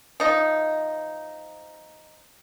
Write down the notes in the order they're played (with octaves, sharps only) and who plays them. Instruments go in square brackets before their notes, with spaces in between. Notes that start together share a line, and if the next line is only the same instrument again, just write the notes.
[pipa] F3 D#4